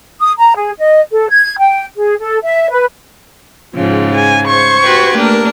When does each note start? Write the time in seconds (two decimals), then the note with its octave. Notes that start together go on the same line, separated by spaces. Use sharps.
0.20 D#6
0.39 A#5
0.56 G#4
0.79 D#5
1.13 A4
1.29 G#6
1.57 G5
1.96 G#4
2.19 A4
2.43 E5
2.70 B4
3.75 G#2 C#3 F3
4.15 G#5
4.45 C5 C#6 G#6
4.83 F#4 G4 B4
5.16 A3 A#3 D4 A#4